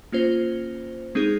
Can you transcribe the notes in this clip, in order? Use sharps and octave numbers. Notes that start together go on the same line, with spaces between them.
A#3 C#4 F4 C5
G#3 C4 D#4 G#4